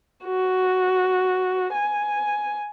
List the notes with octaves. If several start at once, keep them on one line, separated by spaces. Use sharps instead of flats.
F#4
G#5